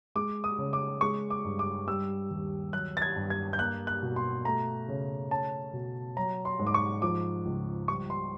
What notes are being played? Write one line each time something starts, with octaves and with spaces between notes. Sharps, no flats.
G#3 D6
D#6
C#3
D6
G#3 C#6
D6
G2
D6
G3 E6
D#2
F#3 F#6
A6
G#6
G2
G#6
G6
A#3 F#6
F#6
B2
C6
A3 A#5
C#3
C#4 A5
B2
F#3 A#5
C6
G#2
D6
C#6
F3 D6
C#2
G3 C#6
C6